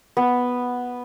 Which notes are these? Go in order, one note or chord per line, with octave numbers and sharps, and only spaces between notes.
B3